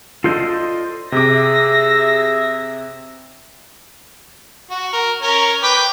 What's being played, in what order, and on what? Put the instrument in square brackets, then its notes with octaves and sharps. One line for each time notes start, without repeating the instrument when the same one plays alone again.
[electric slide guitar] F4 A4 C5 D5 D#5
[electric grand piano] C3 D6 [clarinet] G#4 [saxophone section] E5 [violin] A#6
[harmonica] F#4
A#4
C#4 A#4
B4 G5 D6